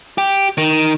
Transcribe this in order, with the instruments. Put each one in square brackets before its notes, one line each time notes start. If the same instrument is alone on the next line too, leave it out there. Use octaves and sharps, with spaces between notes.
[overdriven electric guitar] G4
D#3